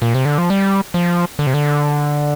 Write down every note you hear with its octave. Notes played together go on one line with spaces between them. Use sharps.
A#2
C3
D3
F3
G3
F3
D3
C3
D3